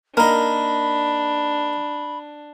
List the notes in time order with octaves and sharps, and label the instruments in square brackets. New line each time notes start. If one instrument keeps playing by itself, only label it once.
[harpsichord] A#3 D#4 [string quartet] D4 [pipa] A#4 [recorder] B5